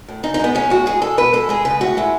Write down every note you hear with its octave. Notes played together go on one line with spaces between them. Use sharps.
A2
C#3 D#4
D#4
G#3 B3
G#3 C#4
A2 F#4
A2 G#4
G#3 A4
B2 B4
G#3 A4
G#3 G#4
C#3 B4
A2 F#4
G#3 E4